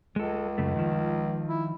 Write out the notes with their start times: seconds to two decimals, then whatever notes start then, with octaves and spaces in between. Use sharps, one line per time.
0.16 C#2 G#3 A4
0.58 F#2 C#3 A3
0.76 D#3 F3
1.49 E4